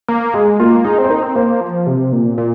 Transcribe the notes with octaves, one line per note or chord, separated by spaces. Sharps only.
A#3
G#3 G#4
A#3 F4
D#4 G#4
C4
C5
D#4 A#4
C4
A#3 C5
F3
C3
A#2
A#2